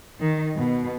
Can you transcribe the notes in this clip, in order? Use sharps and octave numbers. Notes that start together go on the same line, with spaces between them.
D#3
B2